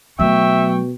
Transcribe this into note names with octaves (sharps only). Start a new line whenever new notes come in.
B2 F#3 A3 E5 G5 C#6